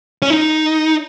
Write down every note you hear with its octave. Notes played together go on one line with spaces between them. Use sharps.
C#4
D#4